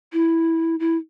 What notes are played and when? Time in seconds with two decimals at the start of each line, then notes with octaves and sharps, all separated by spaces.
0.13 E4
0.80 E4